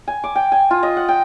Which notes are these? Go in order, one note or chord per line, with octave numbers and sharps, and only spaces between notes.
G#5
D6
G5
G#5
F4
D#5
F#5
G5